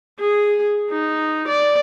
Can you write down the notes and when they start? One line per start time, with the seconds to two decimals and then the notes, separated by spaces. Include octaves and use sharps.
0.20 G#4
0.91 D#4
1.48 D5